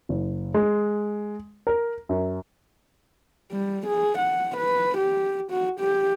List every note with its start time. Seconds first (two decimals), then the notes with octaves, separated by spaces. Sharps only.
0.09 F#1
0.54 G#3
1.67 A#4
2.09 F#2
3.52 G3
3.87 G#4
4.18 F#5
4.57 B4
4.98 G4
5.51 F#4
5.80 G4